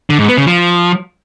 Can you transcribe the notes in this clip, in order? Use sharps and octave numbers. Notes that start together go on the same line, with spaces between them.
D3
G#2
B3
C#3
F3